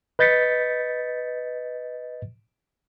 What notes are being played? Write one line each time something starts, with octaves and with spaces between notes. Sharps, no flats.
B4 D#5 G6 A6 B6 C#7